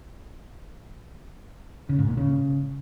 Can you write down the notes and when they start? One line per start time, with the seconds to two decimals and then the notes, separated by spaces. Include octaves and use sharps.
1.89 C#3
1.99 G#2
2.08 A#2
2.17 C#3